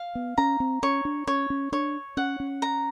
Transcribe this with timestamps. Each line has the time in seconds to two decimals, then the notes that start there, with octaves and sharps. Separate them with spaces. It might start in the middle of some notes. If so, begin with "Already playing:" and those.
Already playing: F5
0.15 B3
0.38 C#4 A#5
0.60 C4
0.83 C#4 C#5
1.05 D4
1.27 C#4 C#5
1.50 C#4
1.72 D4 C#5
2.17 C#4 F#5
2.40 C#4
2.62 A#5